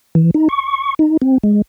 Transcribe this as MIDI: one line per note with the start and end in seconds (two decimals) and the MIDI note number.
0.15 0.31 52
0.34 0.48 63
0.49 0.94 85
0.99 1.17 63
1.22 1.38 60
1.43 1.62 56